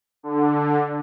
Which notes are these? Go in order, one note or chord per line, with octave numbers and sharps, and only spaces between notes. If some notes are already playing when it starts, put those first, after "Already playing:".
D3